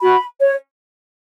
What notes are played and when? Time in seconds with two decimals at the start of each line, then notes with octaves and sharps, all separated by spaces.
0.01 F#4 B5
0.40 C#5